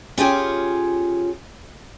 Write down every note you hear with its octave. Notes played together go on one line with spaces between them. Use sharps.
C#4 F4 G4 G#4 C#5